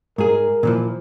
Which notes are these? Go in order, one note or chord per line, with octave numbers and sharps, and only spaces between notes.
G#2 G#4 A#4
A#2 E3 F3